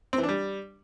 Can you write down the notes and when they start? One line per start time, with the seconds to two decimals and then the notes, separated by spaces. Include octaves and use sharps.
0.13 C4
0.18 E3
0.23 D4
0.29 G3